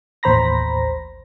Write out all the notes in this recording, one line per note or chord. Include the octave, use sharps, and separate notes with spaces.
A1 D#2 C5 A#5 B5 A#6